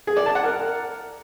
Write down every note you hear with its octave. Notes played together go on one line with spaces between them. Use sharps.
G#4
D5
A5
F#5
A#4